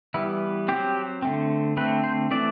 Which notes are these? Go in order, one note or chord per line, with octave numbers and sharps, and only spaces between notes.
E3 G3 B3 E4
F#3 C4 G4
D3 A3 C4
D3 A3 C4 B4
C5
E3 A3 C4 D5